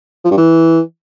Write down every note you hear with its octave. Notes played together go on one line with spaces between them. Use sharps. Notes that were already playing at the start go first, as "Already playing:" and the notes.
F3
G2
E3